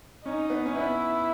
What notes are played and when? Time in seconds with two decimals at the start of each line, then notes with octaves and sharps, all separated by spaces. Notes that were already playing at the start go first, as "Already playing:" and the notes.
0.25 C#4 D#4
0.50 B3
0.66 C#4
0.76 B3 E4